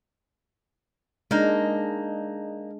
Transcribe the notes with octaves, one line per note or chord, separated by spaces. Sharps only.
G#3 A#3 D4 D#4